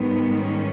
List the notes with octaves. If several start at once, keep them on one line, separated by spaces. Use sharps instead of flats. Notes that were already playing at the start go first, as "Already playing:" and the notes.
Already playing: G#2 D#3 G3 B3
C#4